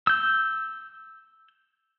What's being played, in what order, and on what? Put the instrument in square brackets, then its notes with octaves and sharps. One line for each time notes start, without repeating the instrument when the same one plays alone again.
[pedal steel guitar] E6 G6